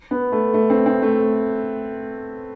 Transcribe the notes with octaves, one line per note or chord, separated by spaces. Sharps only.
B3
A3
A3
C4
C4
A3